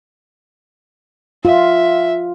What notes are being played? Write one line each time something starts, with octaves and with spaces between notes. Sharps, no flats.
F4 E5